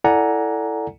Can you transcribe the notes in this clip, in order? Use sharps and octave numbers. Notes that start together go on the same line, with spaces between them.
E4 A4 D5 F#5 G#5 A#5